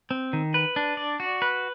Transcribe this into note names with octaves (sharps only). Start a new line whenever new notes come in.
C4
D#3
B4
D4
D5
F#4
B4